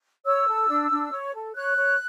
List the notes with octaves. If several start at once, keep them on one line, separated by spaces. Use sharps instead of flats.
C#5 E6
A4
D4
D4
C#5
A4
C#5 F#6
C#5